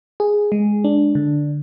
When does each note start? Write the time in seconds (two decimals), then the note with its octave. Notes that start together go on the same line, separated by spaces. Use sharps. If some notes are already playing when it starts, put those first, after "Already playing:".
0.20 G#4
0.52 G#3
0.84 D4
1.15 D3